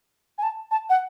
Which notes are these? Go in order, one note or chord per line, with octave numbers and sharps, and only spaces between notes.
G#5
A5
A5
F#5